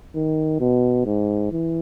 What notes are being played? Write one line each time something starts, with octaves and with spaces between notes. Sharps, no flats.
D#3
B2
G#2
E3